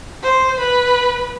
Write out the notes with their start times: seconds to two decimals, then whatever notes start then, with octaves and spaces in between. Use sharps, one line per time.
0.23 C5
0.59 B4